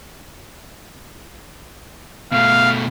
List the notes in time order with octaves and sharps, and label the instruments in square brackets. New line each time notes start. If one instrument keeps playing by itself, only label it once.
[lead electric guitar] B2 A3 [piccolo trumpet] F5